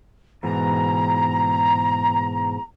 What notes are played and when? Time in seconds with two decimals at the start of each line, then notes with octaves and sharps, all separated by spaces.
0.43 G#2 B2 E3 A#5